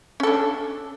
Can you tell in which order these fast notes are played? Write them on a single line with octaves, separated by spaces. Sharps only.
C#4 A4 D4